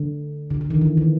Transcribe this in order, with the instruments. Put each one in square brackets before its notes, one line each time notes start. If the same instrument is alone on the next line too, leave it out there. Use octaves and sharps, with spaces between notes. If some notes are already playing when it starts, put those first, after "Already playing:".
Already playing: [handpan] D3
D3
D3
D#3
E3
D#3